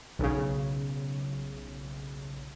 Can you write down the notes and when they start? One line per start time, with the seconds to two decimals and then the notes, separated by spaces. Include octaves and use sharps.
0.19 B1 C#3